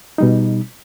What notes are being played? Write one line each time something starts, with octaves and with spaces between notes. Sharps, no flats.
B2 G3 D#4